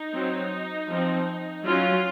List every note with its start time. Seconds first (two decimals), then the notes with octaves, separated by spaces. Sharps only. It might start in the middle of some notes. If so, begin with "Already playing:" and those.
Already playing: D#4
0.13 F#3 C4
0.89 F3 C4
1.67 F#3 C#4 F4